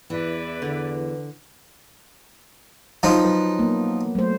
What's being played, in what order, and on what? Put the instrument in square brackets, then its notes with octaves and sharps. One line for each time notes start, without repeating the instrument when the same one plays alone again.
[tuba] E2 [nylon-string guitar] E3 [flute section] E4 B4 D5
[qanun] D3
[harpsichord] F3 D#4 [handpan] F#3
[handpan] F#3 B4
A#3 B3
F#3 A3 C5